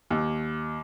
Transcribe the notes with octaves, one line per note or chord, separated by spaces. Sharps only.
D#2